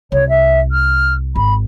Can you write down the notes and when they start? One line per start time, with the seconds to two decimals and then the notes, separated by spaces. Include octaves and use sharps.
0.12 C2 C#5
0.29 E5
0.71 F6
1.36 G#1 B5